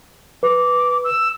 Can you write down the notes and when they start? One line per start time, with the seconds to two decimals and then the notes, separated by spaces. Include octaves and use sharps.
0.43 B4 D6
1.04 E6